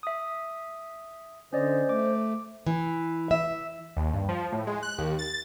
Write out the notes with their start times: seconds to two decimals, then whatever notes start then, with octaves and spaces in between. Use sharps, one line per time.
0.03 E5 D#6
1.53 D3 C#4 C5 D5 D#5
1.89 A3 D6
2.67 E3
3.31 E5
3.97 D#2
4.13 G2
4.28 F3
4.52 A2
4.67 G#3
4.83 F#6
4.98 D#2
5.19 A6